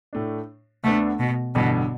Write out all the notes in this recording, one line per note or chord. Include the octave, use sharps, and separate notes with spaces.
A2 A3 D4
D2 D3 A3 B3 D4
B2
A1 G2 B2 D3 G3